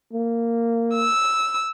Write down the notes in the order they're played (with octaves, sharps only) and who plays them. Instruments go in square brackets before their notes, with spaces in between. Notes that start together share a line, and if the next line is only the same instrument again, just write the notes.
[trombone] A#3
[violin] E6